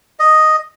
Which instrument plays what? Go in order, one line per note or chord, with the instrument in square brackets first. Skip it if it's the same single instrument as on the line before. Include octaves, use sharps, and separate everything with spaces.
[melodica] D#5